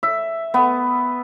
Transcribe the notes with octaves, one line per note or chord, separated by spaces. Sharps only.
E5
B3